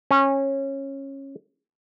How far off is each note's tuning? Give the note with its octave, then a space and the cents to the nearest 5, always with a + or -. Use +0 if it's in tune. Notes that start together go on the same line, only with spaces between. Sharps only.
C#4 -20